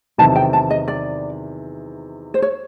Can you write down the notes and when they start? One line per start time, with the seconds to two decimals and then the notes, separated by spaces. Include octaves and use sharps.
0.18 E2 C3 D#3 F#3 A5
0.36 G5
0.53 A5
0.70 D#5
0.88 D5
2.34 C5
2.42 C#5